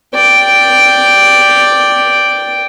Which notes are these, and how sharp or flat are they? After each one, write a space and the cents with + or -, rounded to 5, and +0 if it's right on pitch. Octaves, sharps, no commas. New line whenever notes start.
D5 +0 G5 +0